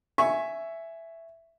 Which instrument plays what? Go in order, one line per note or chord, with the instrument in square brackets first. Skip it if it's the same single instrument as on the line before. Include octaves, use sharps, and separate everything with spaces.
[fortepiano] E5 G#5 C#6